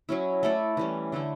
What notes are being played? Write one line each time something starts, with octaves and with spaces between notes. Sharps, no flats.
F#3 C#4 E4
A3 E4 A4 D5
E3 G3 C#4
D3 A3 E4